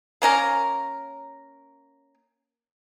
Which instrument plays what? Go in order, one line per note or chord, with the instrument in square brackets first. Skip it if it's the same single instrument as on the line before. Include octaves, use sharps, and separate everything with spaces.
[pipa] A#3 C#4 A#4 F5